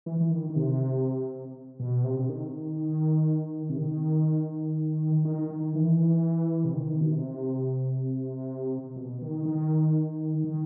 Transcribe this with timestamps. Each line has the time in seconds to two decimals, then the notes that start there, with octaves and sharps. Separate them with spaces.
0.06 E3
0.20 E3
0.31 D#3
0.50 D#3
0.56 C3
1.79 B2
2.04 C3
2.19 C3
2.29 D#3
3.69 C3
3.78 D#3
5.25 D#3
5.51 D#3
5.75 E3
6.65 C3
6.74 D#3
7.01 B2
7.11 C3
8.96 B2
9.22 D#3
9.45 D#3
10.44 D#3